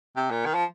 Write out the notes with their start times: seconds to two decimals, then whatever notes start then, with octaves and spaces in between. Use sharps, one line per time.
0.17 C3
0.31 A#2
0.46 D#3
0.54 F3